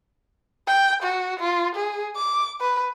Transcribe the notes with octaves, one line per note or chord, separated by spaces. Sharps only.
G5
F#4
F4
G#4
D6
B4